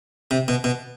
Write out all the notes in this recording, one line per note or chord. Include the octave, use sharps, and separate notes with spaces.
C3
B2
B2